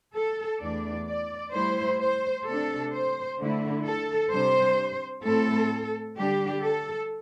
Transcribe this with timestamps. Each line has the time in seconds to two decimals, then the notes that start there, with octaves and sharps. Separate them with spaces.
0.15 A4
0.61 E2 E3 A3 D4 D5
1.07 D5
1.53 A2 G3 E4 C5
1.99 C5
2.46 C3 A3 D4 A4
2.92 C5
3.38 D3 A3 E4
3.85 A4
4.31 C3 G3 D4 C5
5.23 A2 A3 C4 E4 A4
6.17 D3 G3 D4 G4
6.62 A4